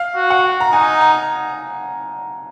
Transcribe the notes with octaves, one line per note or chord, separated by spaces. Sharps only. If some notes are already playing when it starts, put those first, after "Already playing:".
Already playing: F5
F#4
F#5
A#5
D#4 G#5
A#5